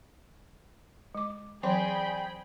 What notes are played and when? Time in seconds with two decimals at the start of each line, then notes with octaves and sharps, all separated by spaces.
1.15 G#3 D6
1.63 E3 F#3 C4 G#4 D5 G5 B5